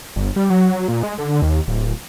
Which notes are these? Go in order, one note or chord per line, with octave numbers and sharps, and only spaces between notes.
G1
G3
F#3
A#2
G#3
D3
D#2
D1